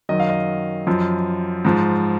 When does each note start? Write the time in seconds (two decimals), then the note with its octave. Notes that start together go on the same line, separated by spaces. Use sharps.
0.09 F#2 D#3 F#3 D#5
0.19 F5
0.30 D#5
0.87 F#2 F3
1.65 G#2 F3